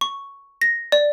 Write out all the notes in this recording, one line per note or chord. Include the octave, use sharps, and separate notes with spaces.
C#6
A#6
D5